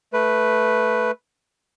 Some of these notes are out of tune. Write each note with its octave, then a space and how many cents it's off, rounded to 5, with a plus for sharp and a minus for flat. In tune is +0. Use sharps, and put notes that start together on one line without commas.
A3 +0 B4 +0